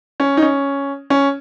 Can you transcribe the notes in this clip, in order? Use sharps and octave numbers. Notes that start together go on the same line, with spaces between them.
C#4
D#4
C#4
C#4